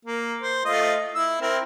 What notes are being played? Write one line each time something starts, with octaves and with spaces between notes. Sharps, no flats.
A#3
C5
A3 F4 D#5
E4 E6
C4 E4 A#4